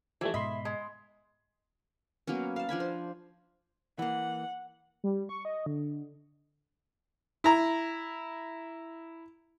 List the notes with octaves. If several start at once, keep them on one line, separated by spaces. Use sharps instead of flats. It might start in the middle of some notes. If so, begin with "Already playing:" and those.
E3 F3 G3 A3
G#2 B2 D#5 E5 B5 C6
G#3
F#3 A#3 B3 C#4
F5 A5
F3 D4 G#5 B5
C5
E3 A#3 F#5
G3
C#6
D#5
D3
E4 A#5